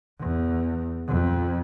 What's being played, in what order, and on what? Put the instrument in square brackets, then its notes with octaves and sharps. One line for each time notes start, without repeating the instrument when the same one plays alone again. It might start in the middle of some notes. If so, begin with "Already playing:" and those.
[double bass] E2
F2